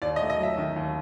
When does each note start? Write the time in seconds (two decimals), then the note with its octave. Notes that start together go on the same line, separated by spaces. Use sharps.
0.02 D#2 D5
0.16 D#5
0.21 A3
0.30 D#5
0.39 F#3 E5
0.58 D#3
0.76 D#2